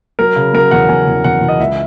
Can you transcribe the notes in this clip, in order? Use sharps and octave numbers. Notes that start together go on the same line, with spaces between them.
F#3 A#4
C#3
F#3 A#4
E2 F#5
E2 G#5
E2
E2 F#5
E2
D#5
C#2 E5